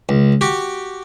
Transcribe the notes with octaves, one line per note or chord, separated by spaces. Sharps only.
C#2
F#4 G4